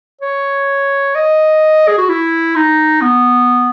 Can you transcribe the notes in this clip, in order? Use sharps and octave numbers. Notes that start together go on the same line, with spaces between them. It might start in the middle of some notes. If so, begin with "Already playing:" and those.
C#5
D#5
G#4
F#4
E4
D#4
B3